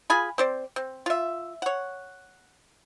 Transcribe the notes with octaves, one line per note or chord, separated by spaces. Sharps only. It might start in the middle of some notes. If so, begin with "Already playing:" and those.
F4 G#4 G#5 B5
C4 C5 D5
C4
F4 E5
C#5 F#5